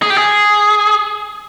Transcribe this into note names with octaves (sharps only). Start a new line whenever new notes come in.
G#4
G4
G#4